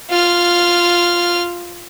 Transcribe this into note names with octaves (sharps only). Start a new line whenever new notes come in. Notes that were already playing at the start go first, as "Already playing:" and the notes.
F4 F6